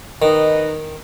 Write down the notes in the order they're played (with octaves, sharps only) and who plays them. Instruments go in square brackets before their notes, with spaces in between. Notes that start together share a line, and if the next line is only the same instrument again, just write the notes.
[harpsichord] D#3 [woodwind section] D#4 B4 D#5